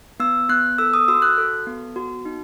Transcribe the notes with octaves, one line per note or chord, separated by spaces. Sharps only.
B3 E6
B3 F#6
A4 E6
D#6
F#4 E6
F#6
A4
B3
F#4
D#4